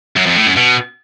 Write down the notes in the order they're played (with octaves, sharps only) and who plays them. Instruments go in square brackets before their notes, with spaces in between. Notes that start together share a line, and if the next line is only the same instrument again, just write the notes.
[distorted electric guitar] F#2
F2
A2
F#2
B2